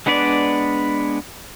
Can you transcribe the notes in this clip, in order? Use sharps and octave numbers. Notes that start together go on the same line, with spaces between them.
G#3 B3 D4 B4 D5